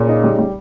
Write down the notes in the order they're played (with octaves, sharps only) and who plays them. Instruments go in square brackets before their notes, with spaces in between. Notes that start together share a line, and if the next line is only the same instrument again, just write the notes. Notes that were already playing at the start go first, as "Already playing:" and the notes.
Already playing: [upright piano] A#2 [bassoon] C#3
[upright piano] D#4
G3
G3